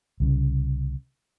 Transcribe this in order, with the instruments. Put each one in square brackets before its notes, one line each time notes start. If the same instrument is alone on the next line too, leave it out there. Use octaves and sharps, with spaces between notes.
[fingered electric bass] C2 C#3